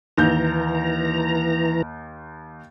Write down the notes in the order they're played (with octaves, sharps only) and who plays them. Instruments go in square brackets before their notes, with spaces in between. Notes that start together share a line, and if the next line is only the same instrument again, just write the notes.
[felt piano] D#2 G6 [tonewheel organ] E3 A#5